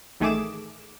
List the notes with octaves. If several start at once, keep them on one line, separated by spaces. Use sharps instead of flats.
A1 D#3 A3 G#4 D6 E7